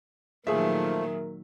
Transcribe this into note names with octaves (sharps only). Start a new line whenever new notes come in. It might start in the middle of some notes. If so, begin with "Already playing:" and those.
A#2 D#3 F3 F#3 A3 G#4 A#4 E5